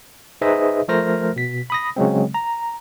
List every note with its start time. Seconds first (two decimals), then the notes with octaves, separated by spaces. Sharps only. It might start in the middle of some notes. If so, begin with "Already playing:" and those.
0.41 D#4 G#4 B4 C5 D#5 E5
0.88 F3 A3 A#4 C5 F6 A#6
1.36 B2 B6
1.70 B5 D#6 A#6
1.96 C#3 F#3 G#3 C4
2.34 A#5